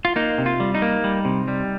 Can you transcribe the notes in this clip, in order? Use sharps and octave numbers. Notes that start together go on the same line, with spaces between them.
F4
A#3 D#4
C3
F4
G3
D#4
A#3
G3
C3
G3